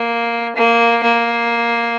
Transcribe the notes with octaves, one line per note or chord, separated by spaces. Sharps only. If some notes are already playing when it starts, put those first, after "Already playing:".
Already playing: A#3
A#3
A#3